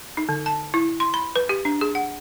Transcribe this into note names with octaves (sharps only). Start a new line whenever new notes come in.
D#4
D3
A5
E4
C6
B5
B4
G4
D4
G#4
F#5